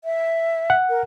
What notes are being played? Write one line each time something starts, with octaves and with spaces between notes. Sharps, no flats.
E5
F#5
A#4